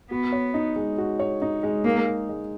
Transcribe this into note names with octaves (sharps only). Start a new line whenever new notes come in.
B3 F#4
C#5
D#4
G#3
F#4
C#5
D#4
G#3
A#3 D#4
G#4
G#3